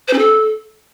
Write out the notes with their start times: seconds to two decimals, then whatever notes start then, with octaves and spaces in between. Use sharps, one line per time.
0.08 C5
0.13 C#4
0.18 A4